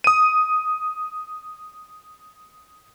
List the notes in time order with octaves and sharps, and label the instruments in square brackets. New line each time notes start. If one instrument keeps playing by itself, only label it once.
[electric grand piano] D#6 D#7